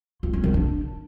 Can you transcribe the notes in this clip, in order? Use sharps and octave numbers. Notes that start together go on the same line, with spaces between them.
F4
C#4
D#3
D4